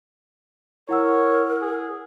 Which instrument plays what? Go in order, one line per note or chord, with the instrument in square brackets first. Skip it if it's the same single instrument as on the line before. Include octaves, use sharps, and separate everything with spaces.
[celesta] E4 F#5 E6 [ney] A#4 [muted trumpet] C#5
[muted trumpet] G#4